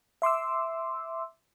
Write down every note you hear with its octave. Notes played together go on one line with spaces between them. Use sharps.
E5 C6 D6 E6